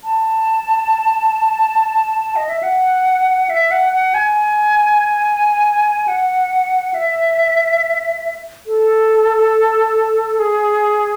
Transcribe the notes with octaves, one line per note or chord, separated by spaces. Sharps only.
A5
D#5
E5
F#5
E5
F#5
F#5
G#5
F#5
E5
A4
G#4